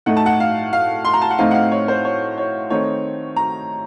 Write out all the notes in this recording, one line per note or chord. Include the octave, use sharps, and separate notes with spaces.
A2 A3 D#4 F#5
A5
F#5
F5
F5
C6
A#5
A5
F#5
A2 A3 C4 D#4 F5
F#5
F5
C#5
C5
C#5
C#5
D#3 A3 C4 D#4 C#5
A#5